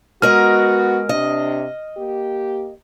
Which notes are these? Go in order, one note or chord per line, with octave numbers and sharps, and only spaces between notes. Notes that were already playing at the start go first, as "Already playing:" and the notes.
G#3 B3 F#4 A#4 D#5 F6
C3 D4 D#5
A#3 G4